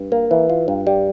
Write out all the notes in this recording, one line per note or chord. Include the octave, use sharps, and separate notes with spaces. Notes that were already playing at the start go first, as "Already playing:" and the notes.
Already playing: G2
A#3
E3
F4
G2
G3